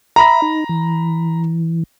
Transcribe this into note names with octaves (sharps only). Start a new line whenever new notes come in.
E5 A#5 B5 A#6
D#4
E3